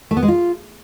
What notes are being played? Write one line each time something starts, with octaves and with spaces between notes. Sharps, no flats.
A3
B3
G#3
F4